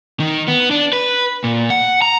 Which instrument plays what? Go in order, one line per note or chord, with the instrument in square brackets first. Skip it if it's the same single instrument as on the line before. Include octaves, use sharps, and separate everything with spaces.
[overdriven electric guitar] D#3
B3
D4
B4
A#2
F#5
A#5